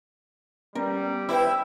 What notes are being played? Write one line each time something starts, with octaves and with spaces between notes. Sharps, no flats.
G3 B3 C#4 A#4
E4 G4 B4 C5 E5 G5